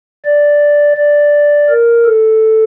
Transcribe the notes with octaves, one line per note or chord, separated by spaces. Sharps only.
D5
D5
A#4
A4